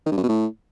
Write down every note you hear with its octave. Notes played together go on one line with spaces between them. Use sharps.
D#3
G2
F#2
B2
A2